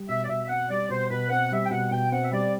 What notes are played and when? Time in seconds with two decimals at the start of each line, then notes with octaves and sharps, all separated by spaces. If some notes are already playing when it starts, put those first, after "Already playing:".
Already playing: G3
0.09 B2 E5
0.24 D5
0.28 B2 E5
0.44 E5
0.49 C4 F#5
0.69 G3 D5
0.89 B2 C5
1.10 B2 B4
1.30 C4 F#5
1.51 G3 E5
1.65 G5
1.71 B2 F#5
1.91 B2 G5
2.12 C4 F#5
2.22 E5
2.32 G3 D5